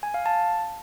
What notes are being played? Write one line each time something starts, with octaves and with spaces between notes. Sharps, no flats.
G#5
F5
A5